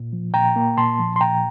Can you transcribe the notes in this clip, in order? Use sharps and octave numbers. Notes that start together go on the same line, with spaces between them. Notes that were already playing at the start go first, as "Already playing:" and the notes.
Already playing: A#2
F3
A#2 G5 A#5
A#3
A#2 A5 C6
F3
C6
A#2 G5 A#5